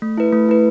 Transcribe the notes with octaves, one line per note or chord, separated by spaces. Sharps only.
A3
E4 B4
A3
E4 B4